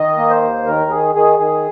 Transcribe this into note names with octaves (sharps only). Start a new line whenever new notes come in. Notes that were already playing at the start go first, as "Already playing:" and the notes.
Already playing: D#3 D#5
A#3
C5
D#2
D#3 A#4
D#3 G#4
D#3 G#4
D#3 G#4